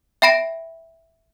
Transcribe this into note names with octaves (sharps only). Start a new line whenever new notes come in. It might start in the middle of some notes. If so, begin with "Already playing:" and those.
E5 G5 B5 A#6 D7